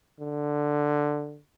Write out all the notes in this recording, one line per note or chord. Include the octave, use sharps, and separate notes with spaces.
D3